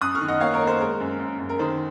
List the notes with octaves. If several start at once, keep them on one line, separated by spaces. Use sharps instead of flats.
F#2 D#6 F#6
C#6 F6
D#3
D#5 F#5
A#3 C#5 F5
A#4 C#5
A#3
C5
G#3 A#4
F#2
F#2
F#2
A#4
D#3 C5